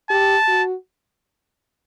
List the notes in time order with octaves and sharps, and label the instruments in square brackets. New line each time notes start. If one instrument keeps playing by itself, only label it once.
[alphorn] G4 [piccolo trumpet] A5
[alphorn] F#4